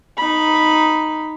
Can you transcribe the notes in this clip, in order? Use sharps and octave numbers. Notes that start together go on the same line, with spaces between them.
D#4 B5